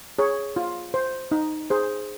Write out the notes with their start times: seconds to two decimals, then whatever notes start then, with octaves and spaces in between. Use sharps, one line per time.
0.19 G#4 C#5
0.56 F4
0.94 C5
1.32 D#4
1.70 G#4 C5